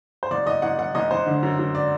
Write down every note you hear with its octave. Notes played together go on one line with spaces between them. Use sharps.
C5
F#1 D5
F#1 D#5
F#1 F#5
F#1 F#5
F#1 D#5
F#1 C5
D3
F#2
F#2
D5